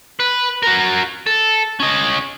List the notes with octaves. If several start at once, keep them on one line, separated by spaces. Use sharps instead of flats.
B4
F#4 A#4
A4
C#4 D#5